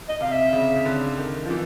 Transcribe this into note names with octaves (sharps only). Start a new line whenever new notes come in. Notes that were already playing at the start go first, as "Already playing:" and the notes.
D#5
C3 F5
E5
C#3
C#3
D3
D#3
F3
E3